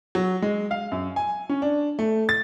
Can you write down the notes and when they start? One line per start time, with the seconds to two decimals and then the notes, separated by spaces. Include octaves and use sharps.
0.15 F#3
0.42 G#3
0.71 F5
0.92 F#2
1.16 G#5
1.49 C#4
1.62 D4
1.99 A3
2.29 A6